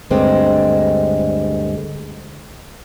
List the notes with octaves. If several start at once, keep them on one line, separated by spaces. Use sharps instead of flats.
D2 G2 D3 G#3 C4